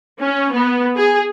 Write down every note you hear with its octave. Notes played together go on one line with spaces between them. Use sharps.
C#4
B3
G#4